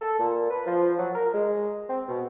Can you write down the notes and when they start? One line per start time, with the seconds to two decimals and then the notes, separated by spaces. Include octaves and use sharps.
0.02 A4
0.19 A#2
0.51 B4
0.66 F3
0.98 F#3
1.15 A#4
1.33 G#3
1.88 C4
2.08 B2